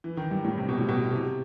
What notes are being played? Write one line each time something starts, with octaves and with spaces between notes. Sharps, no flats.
E3
D#3
G2
A2
C3
B2
A2
B2
C3